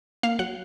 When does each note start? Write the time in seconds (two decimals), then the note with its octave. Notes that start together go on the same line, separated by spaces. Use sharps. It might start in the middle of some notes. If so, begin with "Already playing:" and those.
0.23 A#3 F5
0.39 F#3 F#5